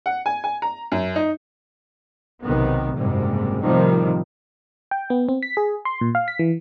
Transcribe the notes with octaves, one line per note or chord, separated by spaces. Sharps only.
F#5
G#5
G#5
A#5
F#2
D#4
B1 C3 D#3 B3
F#1 G#2 C3 G3
A2 C3 D#3 F3 G3
G5
B3
C4
B6
G#4
C6
A#2
F5
B6
E3